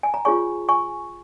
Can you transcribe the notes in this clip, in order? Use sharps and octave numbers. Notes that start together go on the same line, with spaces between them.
G#5
A#5
F4 G#4 C#5 G#5 C#6
G#5 C#6